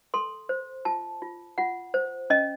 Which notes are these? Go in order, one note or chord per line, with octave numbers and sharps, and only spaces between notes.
A4 C6
C5
F4 A5
F4
F4 F#5
C5
C#4 D#5